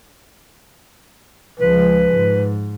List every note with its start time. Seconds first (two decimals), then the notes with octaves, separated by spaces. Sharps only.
1.59 C#2 F3 G#3 B4
2.14 G#2